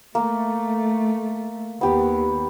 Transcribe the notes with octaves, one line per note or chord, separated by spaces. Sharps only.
A3 A#3
D#2 B3 G4